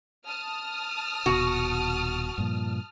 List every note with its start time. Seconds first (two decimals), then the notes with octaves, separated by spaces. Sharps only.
0.26 A5 D#6 F6
1.26 D#1 B2 F#4
2.38 G2 A#2 F3